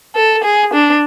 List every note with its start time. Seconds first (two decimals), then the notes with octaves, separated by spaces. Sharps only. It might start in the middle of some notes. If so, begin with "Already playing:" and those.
0.15 A4
0.43 G#4
0.73 D4